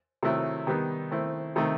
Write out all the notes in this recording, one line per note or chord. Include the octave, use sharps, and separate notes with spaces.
C3 D#3 F#3 A3 E4
D#3 G3 B3 D#4
D#3 A3 C4 E4
C3 D#3 A3 D#4